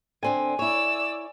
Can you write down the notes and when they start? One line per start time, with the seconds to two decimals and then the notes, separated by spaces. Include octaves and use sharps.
0.23 D3 C4 D4 G#5
0.59 E4 C#5 D5 E6